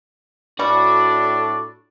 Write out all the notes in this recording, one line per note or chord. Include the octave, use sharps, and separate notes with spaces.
A2 G3 D4 F#4 A4 D5